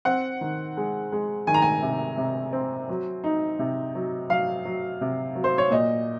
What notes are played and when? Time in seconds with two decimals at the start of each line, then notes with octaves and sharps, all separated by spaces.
0.05 C4 F#5
0.41 D#3
0.77 G#3
1.12 G#3
1.47 D#3 G#5
1.54 A#5
1.62 G#5
1.82 C3
2.17 C3
2.53 C4
2.89 F#3
3.24 D#4
3.59 C3
3.95 F#3
4.30 F#3 F5
4.65 F#3
5.01 C3
5.35 F#3
5.44 C5
5.58 C#5
5.71 A#2 D#5